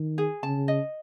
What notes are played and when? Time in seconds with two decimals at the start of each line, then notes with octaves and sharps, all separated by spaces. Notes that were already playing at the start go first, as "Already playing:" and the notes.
Already playing: D#3
0.18 G#4
0.43 C#3 A5
0.68 D#5